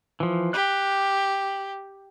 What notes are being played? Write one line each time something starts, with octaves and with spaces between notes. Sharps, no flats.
E3 F3
G4 F#6